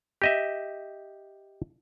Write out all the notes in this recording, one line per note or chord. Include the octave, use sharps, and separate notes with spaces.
G4 D#5 E5